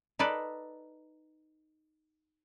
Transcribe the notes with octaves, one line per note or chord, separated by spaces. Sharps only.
D#4 A4 B4 D5